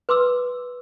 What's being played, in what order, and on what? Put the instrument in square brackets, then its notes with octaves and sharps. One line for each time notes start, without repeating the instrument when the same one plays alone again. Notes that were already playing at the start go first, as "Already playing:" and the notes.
[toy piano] B4 C6 D6 E6